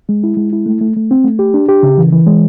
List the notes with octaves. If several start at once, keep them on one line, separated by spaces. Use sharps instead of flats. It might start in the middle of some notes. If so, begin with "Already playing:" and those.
G#3
E4
G#3
E4
A3
A3
A3
C4
A3
G4
D4
G4
C#3
E3
E3
G#3